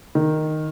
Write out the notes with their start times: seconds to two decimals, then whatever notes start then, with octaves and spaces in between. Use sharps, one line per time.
0.15 D#3